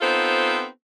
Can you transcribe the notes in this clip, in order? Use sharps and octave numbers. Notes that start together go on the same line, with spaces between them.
B3 C4 D#4 F4 A4 C5